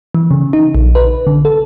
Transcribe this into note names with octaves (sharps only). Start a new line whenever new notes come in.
E3
C#3
D#4
A#1
B4
D3
A4